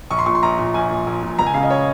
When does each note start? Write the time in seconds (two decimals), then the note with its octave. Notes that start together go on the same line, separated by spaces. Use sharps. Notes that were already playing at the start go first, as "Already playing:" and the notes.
0.10 A#1 C#6
0.19 C6
0.26 A#2 C#6
0.35 C6
0.43 A#1 A#5
0.58 A#2
0.74 A#1 G#5
0.90 A#2
1.07 A#1
1.23 A#2
1.39 C#2 A#5
1.46 G#5
1.54 C#3 F5
1.63 D#5
1.70 C#5